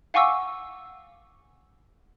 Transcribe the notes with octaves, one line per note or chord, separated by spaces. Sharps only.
F5 F#5 G#5 C#6 D6 E6